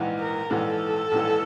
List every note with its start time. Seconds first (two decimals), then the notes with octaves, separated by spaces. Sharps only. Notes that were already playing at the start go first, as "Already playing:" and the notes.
Already playing: A#1 G#2 E3
0.19 A#4
0.50 A#1 G#2 E3 A4
1.11 A#1 G#2 E3